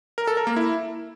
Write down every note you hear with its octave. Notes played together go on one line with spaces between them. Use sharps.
A#4
A4
A#4
A#3
E4